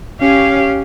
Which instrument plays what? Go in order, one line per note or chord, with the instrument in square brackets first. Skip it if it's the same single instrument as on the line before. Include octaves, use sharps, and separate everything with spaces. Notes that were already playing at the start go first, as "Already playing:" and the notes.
[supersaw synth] C#4 [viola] G4 [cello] F5